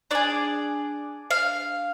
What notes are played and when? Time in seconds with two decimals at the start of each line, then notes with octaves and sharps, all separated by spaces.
0.11 D4 G#4 D5
1.30 F5